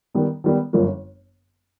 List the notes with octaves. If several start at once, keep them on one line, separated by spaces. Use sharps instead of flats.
D#3 G3 B3
D#3 G3 B3
G1 F#2 D3 F3 A#3